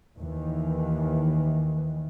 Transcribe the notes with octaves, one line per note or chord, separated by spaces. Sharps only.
D#2 D#3 E3